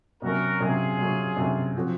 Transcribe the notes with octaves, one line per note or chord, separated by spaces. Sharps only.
C3 F#3 C#4 F#4 A#4
C3 F#3 C#4 F4 G#4
C3 F#3 C#4
C3 F#3 C#4
F3 C4 F#4 C5